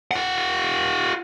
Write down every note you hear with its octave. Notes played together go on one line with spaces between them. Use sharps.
F4 F#5